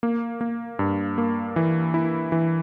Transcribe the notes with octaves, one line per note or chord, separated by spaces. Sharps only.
A#3
A#3
G2
A#3
E3
E4
E3